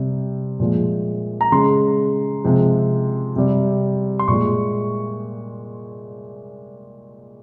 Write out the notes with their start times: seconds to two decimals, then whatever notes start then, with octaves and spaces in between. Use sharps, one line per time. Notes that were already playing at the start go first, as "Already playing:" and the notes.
Already playing: C3 G3
0.60 A#2 F3 G#3
1.41 A#5
1.52 C#3 G#3 C6
2.44 C3 F3 G#3
3.36 C3 G3
4.19 C6
4.28 A#2 G#3 C#6